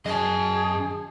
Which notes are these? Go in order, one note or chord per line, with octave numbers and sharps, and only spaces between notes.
F#2 G#4 D#5 A5